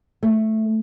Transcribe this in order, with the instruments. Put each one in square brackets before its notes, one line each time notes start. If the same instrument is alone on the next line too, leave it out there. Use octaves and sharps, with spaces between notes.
[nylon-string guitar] A3